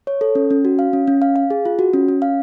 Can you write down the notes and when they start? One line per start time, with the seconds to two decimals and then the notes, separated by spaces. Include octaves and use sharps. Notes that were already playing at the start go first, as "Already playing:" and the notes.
0.07 C#5
0.21 A4
0.35 C#4
0.50 C#4
0.65 F#4
0.79 F5
0.93 C#4
1.08 C#4
1.22 F5
1.36 F5
1.50 G#4
1.65 F4
1.79 F#4
1.93 C#4
2.08 C#4
2.22 F5